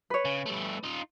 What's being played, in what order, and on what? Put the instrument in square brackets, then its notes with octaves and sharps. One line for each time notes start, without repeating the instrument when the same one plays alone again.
[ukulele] B4 C#5
[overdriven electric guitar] C#3
G3 A3
D#4 F4